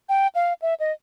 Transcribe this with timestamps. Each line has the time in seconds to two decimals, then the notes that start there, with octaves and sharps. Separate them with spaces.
0.09 G5
0.35 F5
0.62 E5
0.80 D#5